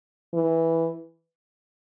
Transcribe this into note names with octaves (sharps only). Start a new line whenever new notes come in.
E3